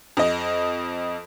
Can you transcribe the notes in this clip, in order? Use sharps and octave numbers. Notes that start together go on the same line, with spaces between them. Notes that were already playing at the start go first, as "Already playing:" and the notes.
F2 D#5